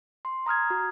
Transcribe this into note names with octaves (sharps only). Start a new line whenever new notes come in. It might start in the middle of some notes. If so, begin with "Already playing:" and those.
C6
A#5 D#6 F6 G#6
F#4